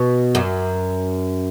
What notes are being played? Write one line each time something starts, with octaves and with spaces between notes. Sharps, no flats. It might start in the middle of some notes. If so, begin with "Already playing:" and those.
Already playing: B2
F#2